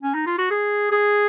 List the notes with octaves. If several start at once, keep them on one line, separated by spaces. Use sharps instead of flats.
C#4
D#4
F4
F#4
G#4
G#4